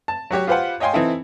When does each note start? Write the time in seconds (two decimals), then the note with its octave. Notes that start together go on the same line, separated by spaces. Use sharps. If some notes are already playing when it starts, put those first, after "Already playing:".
0.08 A5
0.31 F#3 F#4 G4 C#5
0.47 F4 G4 B4 C5 F5 F#5
0.80 C#5 D#5 F5 G5 G#5 C6
0.93 E3 C4 D#4 E4 A4